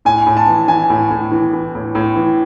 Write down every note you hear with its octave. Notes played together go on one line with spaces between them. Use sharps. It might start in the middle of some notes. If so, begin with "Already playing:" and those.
A2 G#5
A2
A5
E3
E3 G#5
A2
A2
E3
E3
A2
A2
E3